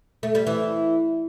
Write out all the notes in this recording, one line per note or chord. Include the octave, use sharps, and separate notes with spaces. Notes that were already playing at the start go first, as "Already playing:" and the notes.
A3
G3
E3